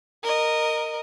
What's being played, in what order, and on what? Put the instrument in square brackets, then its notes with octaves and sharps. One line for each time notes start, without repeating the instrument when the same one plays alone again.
[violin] A#4 D#5